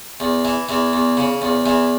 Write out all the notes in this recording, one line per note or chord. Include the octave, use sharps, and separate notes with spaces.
E2
E3
E2 E3
E2
C#3
E2
E2 E3